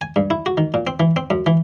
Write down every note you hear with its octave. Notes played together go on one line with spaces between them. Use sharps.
G#5
G2
E4
F#4
D#3
A#2
C4
E3
C4
F#2
E3